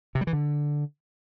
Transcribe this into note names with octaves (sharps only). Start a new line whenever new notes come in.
C3
G3
E3
D3